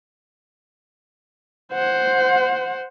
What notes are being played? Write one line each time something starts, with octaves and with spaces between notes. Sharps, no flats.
C5 F#5